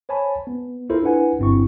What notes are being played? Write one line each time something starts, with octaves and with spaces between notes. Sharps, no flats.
C5 C#5 G#5 A5 B5
B3
E4 F4 A4 A#4 C5
D4 E4 B4 F#5 G#5
G1 G2 C4 E4 C#6